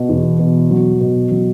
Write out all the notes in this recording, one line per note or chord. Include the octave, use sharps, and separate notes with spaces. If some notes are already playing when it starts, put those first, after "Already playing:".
Already playing: B2
E2
B2
F#3
B2
F#3